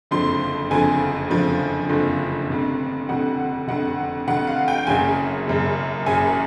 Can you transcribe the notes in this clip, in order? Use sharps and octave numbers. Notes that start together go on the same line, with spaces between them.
F#1 F2 D3 F3 C6
F#1 F2 D3 F3 G#5
F#1 F2 D3 F3
F#1 F2 D3 F3
F1 F2 D3
F1 F2 D3 F#5
F1 F2 D3 F#5
F1 F2 D3 F#5
F5
G5
F#1 F#2 C#3 G#5
F#1 F#2 C#3
F#1 F#2 C#3 G#5